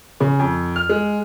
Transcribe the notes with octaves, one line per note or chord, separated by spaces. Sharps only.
C#3
F2
F6
G#3